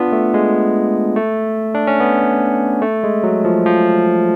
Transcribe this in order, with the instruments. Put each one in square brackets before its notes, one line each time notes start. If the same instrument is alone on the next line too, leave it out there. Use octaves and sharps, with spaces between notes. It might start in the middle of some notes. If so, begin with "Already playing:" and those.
Already playing: [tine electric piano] B3 D4 F4
A3
G#3
A3
D4
C#4
B3
A3
G#3
F#3
F3
F3